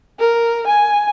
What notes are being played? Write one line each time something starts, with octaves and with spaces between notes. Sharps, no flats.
A#4
G#5